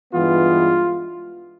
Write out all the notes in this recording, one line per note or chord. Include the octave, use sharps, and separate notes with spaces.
G2 E3 G#3 B3 F4